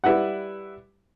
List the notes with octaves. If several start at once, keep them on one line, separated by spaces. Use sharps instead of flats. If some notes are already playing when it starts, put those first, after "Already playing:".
G3 E4 B4 F#5